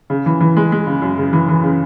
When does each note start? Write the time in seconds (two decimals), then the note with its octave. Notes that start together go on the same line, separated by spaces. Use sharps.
0.10 C#3
0.26 E3
0.41 E3
0.57 G#3
0.72 G#3
0.87 C#3
1.02 F#2
1.18 C#3
1.33 E3
1.49 E3
1.63 C#3